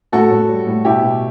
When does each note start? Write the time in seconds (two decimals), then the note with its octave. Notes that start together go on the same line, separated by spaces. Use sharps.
0.12 A2 F#4 A4
0.30 A2
0.49 G3
0.67 A2
0.85 B2 E4 G4
1.03 B2